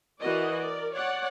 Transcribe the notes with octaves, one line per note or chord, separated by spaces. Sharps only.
E3 F#4 A#4 D5 D#5
A#4 D5
C#5 D5 F#5